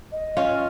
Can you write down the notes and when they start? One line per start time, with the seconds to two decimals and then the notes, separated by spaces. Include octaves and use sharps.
0.12 D#5
0.37 C#4 F4